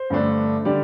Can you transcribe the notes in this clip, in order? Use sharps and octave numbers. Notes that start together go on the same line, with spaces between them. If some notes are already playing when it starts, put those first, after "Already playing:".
Already playing: C5
G2 D3 A3 D4
D3 G3 D5